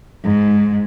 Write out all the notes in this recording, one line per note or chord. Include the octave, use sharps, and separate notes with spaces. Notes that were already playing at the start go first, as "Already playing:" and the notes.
G#2